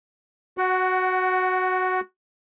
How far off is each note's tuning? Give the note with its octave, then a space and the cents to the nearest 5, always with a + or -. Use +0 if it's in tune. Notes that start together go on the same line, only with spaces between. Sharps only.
F#4 +0 F#5 +20